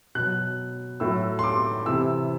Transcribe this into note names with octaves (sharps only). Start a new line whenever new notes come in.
B2 F#3 F#6
A2 F#3 E6
C6
D6
C3 E3 E6